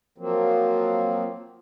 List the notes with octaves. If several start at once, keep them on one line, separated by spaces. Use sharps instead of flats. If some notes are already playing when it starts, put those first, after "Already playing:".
F3 F#3 A#3 C4